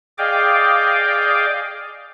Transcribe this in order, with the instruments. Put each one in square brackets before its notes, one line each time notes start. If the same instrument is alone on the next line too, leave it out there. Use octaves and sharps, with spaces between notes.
[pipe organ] G#4 D5 D#5 F5 G5 D6